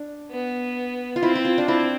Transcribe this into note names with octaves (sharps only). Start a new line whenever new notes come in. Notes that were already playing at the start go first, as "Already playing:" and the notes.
Already playing: D4
B3
F4
C4 E4
E4
F4
D4
C4 E4